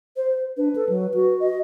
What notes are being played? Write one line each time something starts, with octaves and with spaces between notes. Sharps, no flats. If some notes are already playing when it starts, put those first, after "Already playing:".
C5
D4 B4
A4
F#3
F#4
D#5